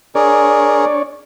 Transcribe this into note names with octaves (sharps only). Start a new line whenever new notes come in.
D4 G#4 A#4 C#5 D5